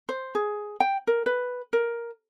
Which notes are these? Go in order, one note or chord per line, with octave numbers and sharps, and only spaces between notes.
C5
G#4
G5
A#4
B4
A#4